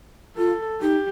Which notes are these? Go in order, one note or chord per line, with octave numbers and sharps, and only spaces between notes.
F4 A4
D#4 G4